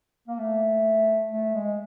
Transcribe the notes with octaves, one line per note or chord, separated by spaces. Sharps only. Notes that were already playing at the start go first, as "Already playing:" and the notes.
A#3
A3
A3
G#3